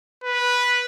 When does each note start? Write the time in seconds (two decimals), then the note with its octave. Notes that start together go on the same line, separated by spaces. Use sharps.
0.24 B4